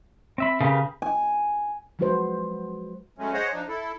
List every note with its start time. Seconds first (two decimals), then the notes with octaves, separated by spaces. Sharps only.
0.38 C4 E5 B5
0.61 C#3 G4 A#4 B4
1.02 G#5
1.99 F3 F#3 G#3 F#4 B4 C5
3.18 F#3 G#3 A3 C#4
3.33 G#4 C5 C#5 D#5 F#5
3.52 F3 D4 D#4
3.69 E4 A4